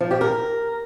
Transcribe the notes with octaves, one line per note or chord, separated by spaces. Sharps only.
F3
G4
A#4